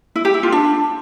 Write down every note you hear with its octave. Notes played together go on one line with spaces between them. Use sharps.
E4
G4
E4
F4
D4